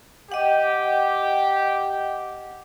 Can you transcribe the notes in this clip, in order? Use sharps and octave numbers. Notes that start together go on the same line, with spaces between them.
G4 D#5 F#5